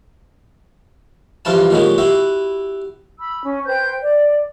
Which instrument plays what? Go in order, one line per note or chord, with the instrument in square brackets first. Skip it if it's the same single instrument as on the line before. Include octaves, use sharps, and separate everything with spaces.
[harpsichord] G2 E3 F3 F4 B4 A5
A#2 D#3 F#3 G#3 F#4 G4
E4 F#4 G4 B4
[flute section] B5 E6
C#4
B4 C5 G5 G6
D5